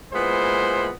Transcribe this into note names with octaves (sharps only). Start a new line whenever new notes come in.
A#2 G#3 B3 E4 C5